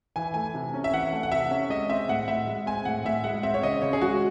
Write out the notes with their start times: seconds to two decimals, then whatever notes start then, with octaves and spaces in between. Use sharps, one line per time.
0.16 E3 G#5
0.34 A3 G#5
0.55 C3
0.74 C#4
0.84 E5
0.92 E3 F#5
1.12 A3
1.23 F#5
1.32 C3 E5
1.51 C#4
1.70 G#3 D#5
1.89 C4 E5
2.08 A2 F#5
2.28 A2 E5
2.47 G#3
2.66 C4 G#5
2.85 A2 F#5
3.05 A2 E5
3.24 G#3 F#5
3.43 C4 E5
3.54 C#5
3.63 C#3 D#5
3.82 C#3 C#5
3.93 G#4
4.01 G#3 F#4